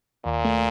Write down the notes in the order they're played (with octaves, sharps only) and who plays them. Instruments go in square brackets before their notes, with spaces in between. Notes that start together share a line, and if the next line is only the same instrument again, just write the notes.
[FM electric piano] D#2 [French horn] A#2
[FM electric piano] A3